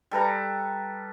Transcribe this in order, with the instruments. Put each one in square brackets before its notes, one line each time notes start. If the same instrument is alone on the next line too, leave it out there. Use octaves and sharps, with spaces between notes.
[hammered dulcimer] G3 A4 B4 A#5